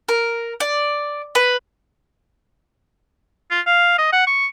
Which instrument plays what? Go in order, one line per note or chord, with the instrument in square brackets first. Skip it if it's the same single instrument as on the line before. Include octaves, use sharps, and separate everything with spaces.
[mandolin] A#4
D5
B4
[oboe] F4
F5
D#5
F#5
C#6